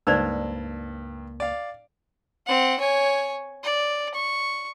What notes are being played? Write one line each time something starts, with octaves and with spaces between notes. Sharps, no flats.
C#2 G2 A#3 D#4 C5 D5 A5 E6
D5 F5
C4 F#5
C#5 G#5
D5
C#6